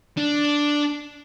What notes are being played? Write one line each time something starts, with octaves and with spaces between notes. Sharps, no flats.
D4